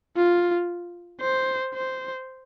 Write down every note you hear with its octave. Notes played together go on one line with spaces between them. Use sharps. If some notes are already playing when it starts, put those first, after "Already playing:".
F4
C5
C5